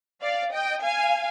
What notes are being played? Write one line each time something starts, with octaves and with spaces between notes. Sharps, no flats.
D5 F5
D#5 G5
F5 G#5